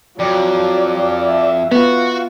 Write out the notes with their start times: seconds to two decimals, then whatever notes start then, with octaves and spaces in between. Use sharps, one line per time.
0.19 F2 F#3 D5
1.24 E5
1.72 B3 F4 F#4